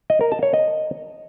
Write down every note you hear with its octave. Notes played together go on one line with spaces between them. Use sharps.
D#5
A#4
A5
C#5
D#5